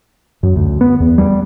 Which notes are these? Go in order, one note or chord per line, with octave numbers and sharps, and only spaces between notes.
F#2
D2
B3
E2
G3